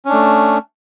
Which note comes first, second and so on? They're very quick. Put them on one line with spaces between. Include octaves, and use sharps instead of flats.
C#4 D4 A3